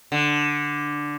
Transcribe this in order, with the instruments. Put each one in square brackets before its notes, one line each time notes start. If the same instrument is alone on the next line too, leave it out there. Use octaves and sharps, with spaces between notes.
[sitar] D3